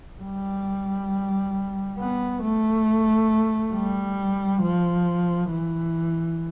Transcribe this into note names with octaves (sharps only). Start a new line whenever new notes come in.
G3
B3
A3
G3
F3
E3